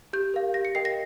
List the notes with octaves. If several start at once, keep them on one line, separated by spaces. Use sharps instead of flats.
G4 G6
A#4 F5
G4 A#6
C#7
A#4 D#5 G5 C7
A#6